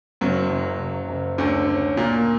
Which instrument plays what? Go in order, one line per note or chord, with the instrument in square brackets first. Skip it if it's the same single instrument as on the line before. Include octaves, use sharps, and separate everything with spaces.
[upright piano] F#1 [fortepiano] F#2 F#3
[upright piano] F#1
F#1
F#1
[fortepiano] D2 D3 [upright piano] C#4
[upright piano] C#4
[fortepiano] A#2 [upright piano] A#3